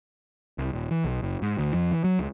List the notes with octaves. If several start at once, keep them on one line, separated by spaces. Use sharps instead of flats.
C2
D#1
E3
B1
F#1
G#2
D2
F2
E3
F#3
C#2